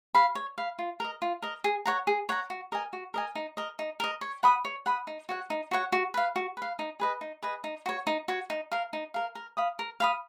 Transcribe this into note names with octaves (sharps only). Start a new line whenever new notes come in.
F5 B5
C#5
F5 B5
F4
A#4 D#5
F4
A#4 D#5
G#4
C#5 F#5 A#5
G#4
C#5 F#5 A#5
F#4
A#4 D#5 G#5
F#4
A#4 D#5 G#5
D#4
A#4 D#5
D#4
A#4 D#5
C#5
F#5 B5 D#6
C#5
F#5 B5 D#6
D#4
F#4 C#5 F#5
D#4
F#4 C#5 F#5
F#4
B4 F5
F#4
B4 F5
D#4
G#4 B4 D#5
D#4
G#4 B4 D#5
D#4
F#4 C#5
D#4
F#4 C#5
D#4
A#4 F5
D#4
A#4 F5
A#4
F5 B5 D#6
A#4
F5 B5 D#6